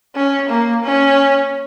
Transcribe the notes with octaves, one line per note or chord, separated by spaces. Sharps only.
C#4
A#3
C#4